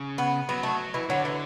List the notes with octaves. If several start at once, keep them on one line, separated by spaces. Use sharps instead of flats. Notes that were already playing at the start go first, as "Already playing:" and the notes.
Already playing: C#3
B3
F#3 B3
A3
E3
D3 F#3
E3